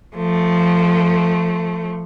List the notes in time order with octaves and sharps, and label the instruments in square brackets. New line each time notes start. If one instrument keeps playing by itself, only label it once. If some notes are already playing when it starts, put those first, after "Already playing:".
[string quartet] F3 A3